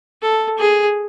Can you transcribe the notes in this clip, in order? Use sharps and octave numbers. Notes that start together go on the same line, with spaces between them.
A4
G#4